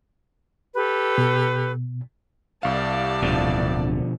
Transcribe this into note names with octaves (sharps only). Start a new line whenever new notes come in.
G4 A4 B4
B2
C2 G4 D5 F5 A5
D1 B2 D3 F3